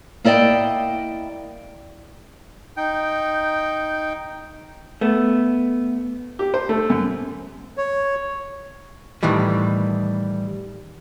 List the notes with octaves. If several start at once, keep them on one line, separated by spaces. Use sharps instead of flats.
A#3 E4 D5 D#5 G5
D#4 G5
A3 B3
G4
C5
A3
F#2
C#5
A2 D#3 E3 G3